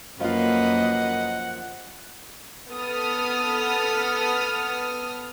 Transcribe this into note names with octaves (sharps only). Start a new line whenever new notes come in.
F#2 F3 A#3 F4 B4 D#5 F#5
B3 A4 D#6 F6